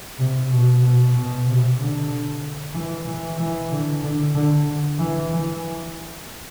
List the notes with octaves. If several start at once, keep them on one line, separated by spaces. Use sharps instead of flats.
C3
B2
B2
B2
C3
D3
E3
E3
E3
D3
D3
D3
E3
E3